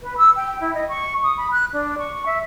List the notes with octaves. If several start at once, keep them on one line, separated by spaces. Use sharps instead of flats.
B4
E6
G5
E4
D#5
C#6
D#6
B5
F#6
D4
C#6
E5